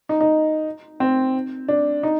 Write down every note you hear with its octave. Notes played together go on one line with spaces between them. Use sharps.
D#4
D#4
C4
D4
D#4